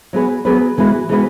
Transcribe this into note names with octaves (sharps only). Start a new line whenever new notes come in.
F#3 B3 G#4 B4
F#3 B3 G#4 B4
E3 G#3 B3 F#4 B4
E3 G#3 B3 F#4 B4